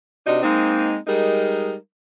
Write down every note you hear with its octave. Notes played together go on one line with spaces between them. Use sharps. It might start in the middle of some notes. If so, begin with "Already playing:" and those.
C3 D4 D#4 F#4 D#5
G#3 A#3 C4 D#4
G3 G#3 D#4 A#4